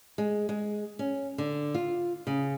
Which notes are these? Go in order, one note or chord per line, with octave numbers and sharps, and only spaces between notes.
G#3
G#3
C#4
D3
F4
C#3